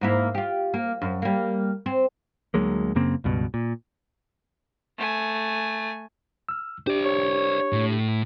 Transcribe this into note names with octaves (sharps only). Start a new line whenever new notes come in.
G#2 A#3 E4
F4 G4
A#3
F#2
G3 A#3
C4
D2 F#3 G#3 A#3
F#2 C#3 A#3 C4
C#2 G2 B2
A#2
A3 G#5
E6 F6
D4 G4 C5 D5
C#5
A2